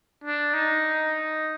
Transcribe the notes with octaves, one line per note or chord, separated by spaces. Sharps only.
D4
D#4